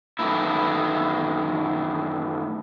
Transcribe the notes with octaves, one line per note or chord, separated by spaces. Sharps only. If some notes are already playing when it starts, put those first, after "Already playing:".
F#2 A2 D#3 E3 A#3 E4